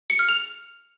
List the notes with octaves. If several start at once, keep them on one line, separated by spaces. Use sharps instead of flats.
C#7
F6
F7